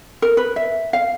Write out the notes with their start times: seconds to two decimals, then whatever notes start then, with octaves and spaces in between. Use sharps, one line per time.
0.22 A#4
0.37 B4
0.56 E5
0.93 F5